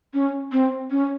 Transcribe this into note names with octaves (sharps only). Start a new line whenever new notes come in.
C#4
C4
C#4